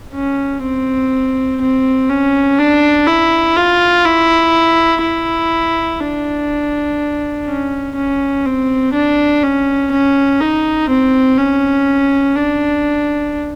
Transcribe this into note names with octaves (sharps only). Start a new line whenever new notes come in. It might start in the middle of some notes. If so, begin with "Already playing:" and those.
C#4
C4
C4
C#4
D4
E4
F4
E4
E4
D4
C#4
C#4
C4
D4
C#4
C#4
D#4
C4
C#4
D4